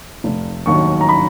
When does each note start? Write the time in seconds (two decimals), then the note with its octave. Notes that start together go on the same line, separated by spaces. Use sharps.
0.24 F1
0.66 D#2 D#3 F#3 C#6
1.01 A#5
1.09 B5